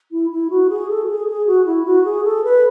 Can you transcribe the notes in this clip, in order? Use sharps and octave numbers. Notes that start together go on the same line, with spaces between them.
E4
E4
F#4
G#4
A4
F#4
G#4
G#4
F#4
E4
F#4
G#4
A4
B4